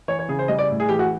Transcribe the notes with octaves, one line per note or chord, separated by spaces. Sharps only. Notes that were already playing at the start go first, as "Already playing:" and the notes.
E3 C#5
C#5
C#3 G#4
C5
G3 D#5
D5
A2
G#4
E3 G4
F#4